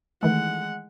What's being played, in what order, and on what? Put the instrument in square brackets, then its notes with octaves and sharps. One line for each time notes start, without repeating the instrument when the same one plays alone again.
[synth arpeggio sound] D#3 E3 A3 [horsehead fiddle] G#3 F#5